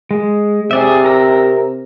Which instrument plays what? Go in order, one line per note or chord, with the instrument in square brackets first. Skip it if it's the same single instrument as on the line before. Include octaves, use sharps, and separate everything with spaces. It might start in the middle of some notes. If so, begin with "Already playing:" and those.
[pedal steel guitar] G#3
[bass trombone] C3 [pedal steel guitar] G#4 D5 E5
[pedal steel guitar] A#4 A#5 E6